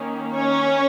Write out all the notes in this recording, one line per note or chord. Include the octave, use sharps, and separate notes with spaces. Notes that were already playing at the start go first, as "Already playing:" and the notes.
Already playing: D#3 A#3 C#4
C#4 C#5